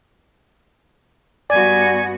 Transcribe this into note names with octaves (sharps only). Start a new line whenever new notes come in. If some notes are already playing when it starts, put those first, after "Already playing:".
G2 B3 F#4 D5 G#5